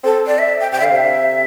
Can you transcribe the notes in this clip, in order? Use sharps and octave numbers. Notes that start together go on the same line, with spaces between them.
C4 A4
D5
E5
G5
C3 G5
D3 E5 F5
C3 E5